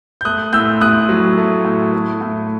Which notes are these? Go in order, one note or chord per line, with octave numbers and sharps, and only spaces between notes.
G6
A3 D#6 F#6
A2 E6 G6
A2 D#6 F#6
F#3
A3
A2
A3
A2